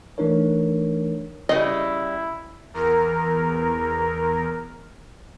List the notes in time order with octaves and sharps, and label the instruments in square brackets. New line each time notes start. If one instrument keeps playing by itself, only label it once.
[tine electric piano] E3 A3 D4 D#4 A#4 C#5
[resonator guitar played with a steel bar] C#3 G3 [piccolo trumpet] E4 [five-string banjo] D#5
[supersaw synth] E2 A#4